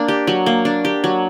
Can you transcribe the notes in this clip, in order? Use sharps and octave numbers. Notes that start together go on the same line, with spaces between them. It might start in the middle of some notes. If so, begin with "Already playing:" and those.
Already playing: A#3 D4
G4
F#3
A#3
D4
G4
F#3